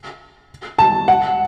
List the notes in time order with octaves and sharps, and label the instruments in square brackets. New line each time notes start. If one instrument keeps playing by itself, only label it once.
[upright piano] A5
F#5